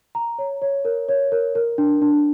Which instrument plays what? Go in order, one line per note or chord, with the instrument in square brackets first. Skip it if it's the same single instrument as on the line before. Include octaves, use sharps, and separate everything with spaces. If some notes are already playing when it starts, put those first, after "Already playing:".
[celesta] A#5
C#5
C#5
A#4
C#5
A#4
A#4
D4
D4